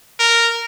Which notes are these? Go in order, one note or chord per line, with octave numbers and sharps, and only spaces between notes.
A#4